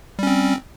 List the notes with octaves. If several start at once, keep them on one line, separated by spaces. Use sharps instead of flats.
G3 C4 C#4